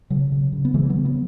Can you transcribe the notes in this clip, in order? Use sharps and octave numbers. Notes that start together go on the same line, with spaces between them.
C#3 F#3
C#3
C#3
B3
C#3 E3 G#3
F#3 B3
C#3
F#3 B3